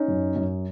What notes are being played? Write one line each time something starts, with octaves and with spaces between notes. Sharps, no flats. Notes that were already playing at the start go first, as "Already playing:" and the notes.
Already playing: C#4 D#4
F#2
F#2